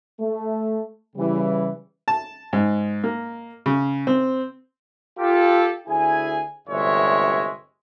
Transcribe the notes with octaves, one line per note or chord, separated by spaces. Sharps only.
A3
C#3 E3 G3
A5
G#2
A#3
C#3
C4
F4 G4 A4
D2 E4 G#4 G#5
G1 D2 C3 G#3 C#5 E5